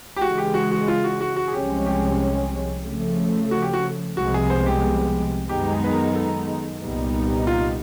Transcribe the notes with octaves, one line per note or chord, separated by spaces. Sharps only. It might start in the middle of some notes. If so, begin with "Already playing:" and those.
G4
C#3 E3 G#3 F#4
G4
F#4
F#4
F4
F#4
F#4
F#4
G#4
C2 C3 F3 G#3 C#4 G4
G4
C#3 F3 A3
F#4
G4
F#4
C2 C3 F3 G#3 B3 F#4
G#4
C5
G4
F#2 D#3 G#3 B3 D#4 G4
G#4
B4
A#4
A4
C2 A#2 G3 B3 D#4
F4